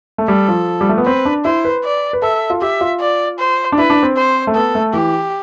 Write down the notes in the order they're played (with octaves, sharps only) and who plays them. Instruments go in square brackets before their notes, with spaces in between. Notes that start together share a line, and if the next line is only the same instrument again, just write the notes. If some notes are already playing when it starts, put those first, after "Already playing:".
[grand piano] A3
[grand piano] G3 [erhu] A4
[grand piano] F3
G3
A3
B3
[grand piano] C4 [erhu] B4
[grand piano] D4
[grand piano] E4 [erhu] C5
[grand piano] B4
[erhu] D5
[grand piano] B4
[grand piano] A4 [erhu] E5
[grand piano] F4
[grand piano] G4 [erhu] E5
[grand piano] F4
[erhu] D5
C5
[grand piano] D4
[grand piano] E4 [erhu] B4
[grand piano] D4
C4
[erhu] C5
[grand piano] A3
[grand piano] B3 [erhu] A4
[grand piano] A3
[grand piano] E3 [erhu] G4